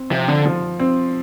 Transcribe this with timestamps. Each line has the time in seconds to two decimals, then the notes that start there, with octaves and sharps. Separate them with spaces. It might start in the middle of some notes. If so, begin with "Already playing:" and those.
Already playing: C4
0.11 C3 F3
0.28 D3
0.45 F3
0.80 C4